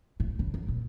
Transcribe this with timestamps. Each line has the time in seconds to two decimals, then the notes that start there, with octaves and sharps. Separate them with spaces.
0.20 A2
0.39 C#3
0.54 F#2
0.68 A#2